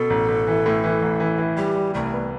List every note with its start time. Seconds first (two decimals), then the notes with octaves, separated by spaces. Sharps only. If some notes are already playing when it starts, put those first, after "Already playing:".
Already playing: B2 A4
0.10 A1
0.28 A1
0.47 E3
0.66 A2
0.84 E3
1.02 A1
1.20 E3
1.38 E3
1.57 G3 G4
1.75 G3
1.94 C2 A3
2.13 B3